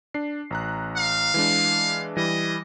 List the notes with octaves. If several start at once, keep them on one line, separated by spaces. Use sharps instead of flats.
D4 C7
A1 A#5 F#6
F5
E3 G#3 D4
E3 G3 D#5